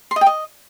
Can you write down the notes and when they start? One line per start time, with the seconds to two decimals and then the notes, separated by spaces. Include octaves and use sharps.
0.11 C6
0.16 D#5
0.21 G5
0.26 D#5